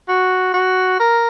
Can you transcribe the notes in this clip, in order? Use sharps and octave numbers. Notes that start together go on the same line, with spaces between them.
F#4
F#4
A#4